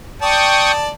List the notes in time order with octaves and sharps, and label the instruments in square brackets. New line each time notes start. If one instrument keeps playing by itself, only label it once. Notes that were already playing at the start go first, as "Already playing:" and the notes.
[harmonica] D5 A5 [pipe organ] G5 C#6 D#6